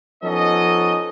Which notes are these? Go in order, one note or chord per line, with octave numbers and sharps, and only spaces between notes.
F3 B3 C#4 D#4 A4 D#5